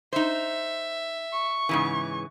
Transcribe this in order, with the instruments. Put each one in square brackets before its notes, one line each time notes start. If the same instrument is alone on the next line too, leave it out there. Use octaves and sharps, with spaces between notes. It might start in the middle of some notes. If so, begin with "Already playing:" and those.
[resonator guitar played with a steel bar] D#4 C5 [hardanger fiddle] E5
[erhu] C#6
[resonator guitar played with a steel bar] G#2 C#3 E3